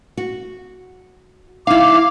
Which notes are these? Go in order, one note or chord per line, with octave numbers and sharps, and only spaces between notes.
F#4
D#4 E4 F5 D6